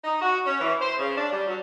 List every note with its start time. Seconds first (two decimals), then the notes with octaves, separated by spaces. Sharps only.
0.04 D#4
0.21 F#4
0.45 C#4
0.60 E3
0.80 C5
0.98 C#3
1.16 D4
1.32 G3
1.46 F#3